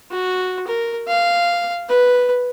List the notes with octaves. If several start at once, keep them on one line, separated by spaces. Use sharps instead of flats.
F#4
A#4
F5
B4